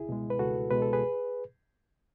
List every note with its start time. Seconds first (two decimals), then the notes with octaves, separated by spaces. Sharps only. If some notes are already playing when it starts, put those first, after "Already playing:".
Already playing: C#2 E4 G#4
0.09 B2 G#3
0.30 B4
0.39 C#2 F#4 A4
0.71 B2 G#3 B4
0.82 A4
0.93 G#4 B4